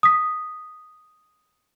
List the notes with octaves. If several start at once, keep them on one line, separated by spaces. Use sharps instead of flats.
D#6 B6